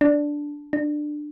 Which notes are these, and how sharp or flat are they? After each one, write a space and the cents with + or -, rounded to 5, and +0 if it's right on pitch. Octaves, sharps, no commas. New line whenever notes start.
D4 -5
D4 +20